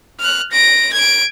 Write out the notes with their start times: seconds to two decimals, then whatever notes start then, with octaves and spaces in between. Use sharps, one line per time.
0.20 F6 F#6
0.52 A#6 D7
0.93 G#6 D7